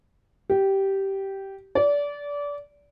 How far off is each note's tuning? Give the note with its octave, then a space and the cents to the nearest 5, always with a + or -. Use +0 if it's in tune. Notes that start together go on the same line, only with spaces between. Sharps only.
G4 -10
D5 -25